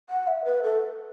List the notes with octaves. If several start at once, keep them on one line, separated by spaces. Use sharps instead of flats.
F#5
E5
B4
A4